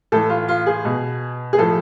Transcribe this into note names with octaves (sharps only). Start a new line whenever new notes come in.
A2 E3 A4
F4
F4
G#4
B2
G#4
A2 F3 A4